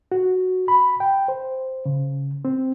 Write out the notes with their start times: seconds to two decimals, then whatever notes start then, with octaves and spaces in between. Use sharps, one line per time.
0.12 F#4
0.68 B5
1.00 G5
1.28 C5
1.86 C#3
2.45 C4